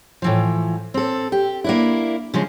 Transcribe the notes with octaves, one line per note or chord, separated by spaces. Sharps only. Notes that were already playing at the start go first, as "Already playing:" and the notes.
A2 E3 F3
C4 A4
G4
A#3 D4 E4
C#3 F3 G#3